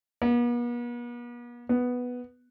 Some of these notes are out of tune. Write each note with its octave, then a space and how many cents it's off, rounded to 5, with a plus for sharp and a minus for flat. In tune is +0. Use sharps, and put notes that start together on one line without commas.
B3 -45
B3 +0